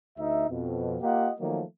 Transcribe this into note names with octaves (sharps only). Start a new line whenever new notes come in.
D2 D#4 E5
F2 B2
A#3 F4 G4 D#5 F#5
D#3 F3 F#3 A3 A#3